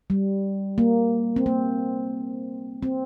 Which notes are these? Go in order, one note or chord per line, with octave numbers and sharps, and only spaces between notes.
G3
A#3
C4
A#3
C4